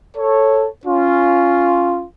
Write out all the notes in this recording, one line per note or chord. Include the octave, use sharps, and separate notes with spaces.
A4 C#5
C#4 F4